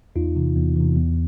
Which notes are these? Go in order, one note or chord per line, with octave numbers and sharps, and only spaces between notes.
E2 D#4 F4
C3 E3
E2
C3 E3
E2